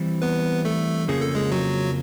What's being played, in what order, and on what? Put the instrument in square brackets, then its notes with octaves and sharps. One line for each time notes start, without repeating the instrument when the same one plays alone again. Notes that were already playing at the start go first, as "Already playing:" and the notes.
Already playing: [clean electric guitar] E3 G3 C4 E4
[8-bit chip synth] B3 B4
A3 A4
[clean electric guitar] F2 C#3 F3 A#3 C#4 [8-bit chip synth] G#4
[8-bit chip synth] A4
G#3 G#4
F#3 F#4